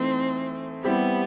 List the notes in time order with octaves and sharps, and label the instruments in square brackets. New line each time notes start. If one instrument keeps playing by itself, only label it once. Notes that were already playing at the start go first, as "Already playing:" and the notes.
Already playing: [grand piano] E3 A3 D#4 [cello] C4
[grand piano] G3 C4 E4 G4 [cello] B3